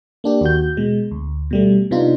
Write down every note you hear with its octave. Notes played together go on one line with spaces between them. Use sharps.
A#3 D4 G4
D#2 F#4 G6
B2 G#3
D2
B2 G3 A3
C3 B3 D4 D#4 F4